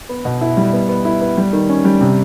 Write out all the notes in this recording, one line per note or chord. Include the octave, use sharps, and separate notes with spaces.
B3
B2
E4
G3
B3
B3
E4
B3
G3
D#3
C#4
G3
C3